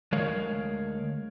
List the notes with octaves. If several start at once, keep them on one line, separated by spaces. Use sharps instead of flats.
D2 G#3 A#4 C#5 F5